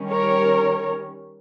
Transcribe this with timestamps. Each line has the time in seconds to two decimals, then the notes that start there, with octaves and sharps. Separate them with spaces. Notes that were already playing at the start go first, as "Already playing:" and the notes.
Already playing: D#3 G3 C#4
0.11 A#4 C#5